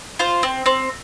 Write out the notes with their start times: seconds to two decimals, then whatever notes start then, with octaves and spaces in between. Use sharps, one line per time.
0.19 F4 C5
0.43 C4
0.66 C4